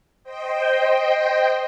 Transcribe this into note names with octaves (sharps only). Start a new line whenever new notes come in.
C5 D#5 G5